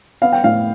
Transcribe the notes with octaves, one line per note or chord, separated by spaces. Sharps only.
B3 F5
G5
A2 F5